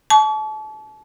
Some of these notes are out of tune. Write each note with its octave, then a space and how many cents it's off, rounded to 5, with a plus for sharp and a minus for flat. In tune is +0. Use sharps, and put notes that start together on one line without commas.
A5 -35 C#6 +45